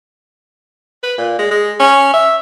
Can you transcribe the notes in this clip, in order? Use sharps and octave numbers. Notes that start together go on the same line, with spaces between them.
B4
A#2
G#3
G#3
C#4
E5